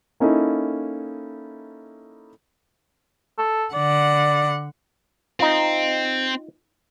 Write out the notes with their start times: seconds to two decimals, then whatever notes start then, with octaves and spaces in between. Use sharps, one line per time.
0.20 A#3 C#4 D#4 E4 A4
3.38 A4
3.74 D3 D5 F#5
5.40 C4 D#4 F4